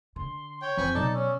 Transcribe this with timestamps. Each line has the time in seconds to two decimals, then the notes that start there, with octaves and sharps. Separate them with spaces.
0.16 D3 C6
0.62 C#5 G5
0.77 F2 E3 C4 F4 G#5 B5 C#6 G6
0.95 B2 F#3 D#4 A4 D5 A5
1.14 C#4 E6